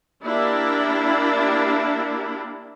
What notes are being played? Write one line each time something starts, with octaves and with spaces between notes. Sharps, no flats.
A#3 D4 E4 G4